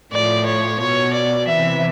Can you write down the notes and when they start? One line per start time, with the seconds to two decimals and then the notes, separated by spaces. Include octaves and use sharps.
0.13 A2 F3 D5
0.46 C#5
0.80 B2 C#5
1.14 D5
1.47 C3 E3 E5